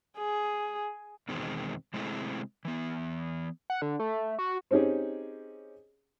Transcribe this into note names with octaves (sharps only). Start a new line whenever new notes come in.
G#4
E2 B2 D#3 G#3 C4
C3 G#3 A3 C4 E4 G#4
E3 B3
F#5
D3
A3
F#4
C4 C#4 D#4 G4 G#4